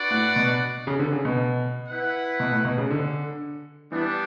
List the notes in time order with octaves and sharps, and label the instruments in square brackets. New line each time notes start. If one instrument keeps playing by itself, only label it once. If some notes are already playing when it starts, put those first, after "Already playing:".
Already playing: [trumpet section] D4 F#4 B4 D5 F#5
[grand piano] A2
B2
C#3
D3
C#3
B2
[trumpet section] E4 B4 F#5
[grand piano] B2
A2
B2
C#3
D3
[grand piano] E3 [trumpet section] G3 B3 D4